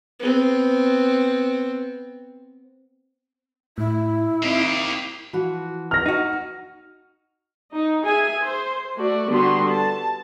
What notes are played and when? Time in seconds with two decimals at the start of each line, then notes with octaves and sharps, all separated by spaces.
0.19 B3 C4
3.78 A2 E4
4.43 A#3 C4 D#4 G4 C7
5.33 E3 F3 F#4
5.91 F6 A#6
6.06 D#4 F#4
7.74 D#4
8.05 G#4 E5 G#5
8.43 C5
8.97 A3 F#4 D5
9.28 D3 G3 B3 F#4 C6
9.67 A5